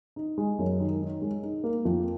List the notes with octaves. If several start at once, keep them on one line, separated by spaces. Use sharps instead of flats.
D#4
G#3
F#2
D#3
D#4
G#3
D#4
A#3
F2